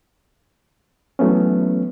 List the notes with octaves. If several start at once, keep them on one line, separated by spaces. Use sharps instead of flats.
E3 F#3 A3 B3 C#4